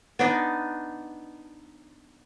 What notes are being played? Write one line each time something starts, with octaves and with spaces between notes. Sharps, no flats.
B3 D4 D#4